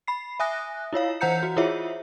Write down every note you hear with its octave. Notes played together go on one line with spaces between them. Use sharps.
B5 C7
E5 G#5 D#6 F#6 A#6
E4 F4 C#5 F5
E3 C5 F#5 A#5 G6 C#7
F#4
E4 F4 G#4 C5 C#5 E5